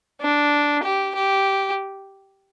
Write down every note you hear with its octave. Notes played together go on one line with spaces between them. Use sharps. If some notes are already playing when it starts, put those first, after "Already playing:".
D4
G4
G4